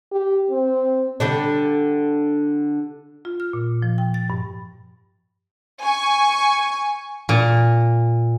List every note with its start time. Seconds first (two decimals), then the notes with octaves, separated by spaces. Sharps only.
0.12 G4
0.51 C4
1.20 D3 G3 D4
3.25 F4
3.40 F6
3.53 A#2
3.82 F3
3.98 G5
4.14 A6
4.30 G2
5.83 G#5 C#6
7.29 A#2